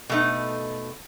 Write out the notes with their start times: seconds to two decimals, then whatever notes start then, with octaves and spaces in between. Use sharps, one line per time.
0.09 B2 A3 D#4